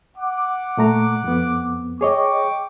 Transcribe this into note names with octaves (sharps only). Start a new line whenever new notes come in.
F#5 D6
A#2 A3 A#5
F2 B3
G#4 C#5 D#5 G5 C#6 D6